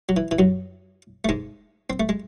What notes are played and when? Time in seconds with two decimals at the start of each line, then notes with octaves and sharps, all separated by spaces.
0.09 F#3
0.17 E3
0.31 E3
0.39 F#2 F#3
1.25 A3
1.29 G#2 G#3
1.90 C4
2.00 A3
2.09 G#3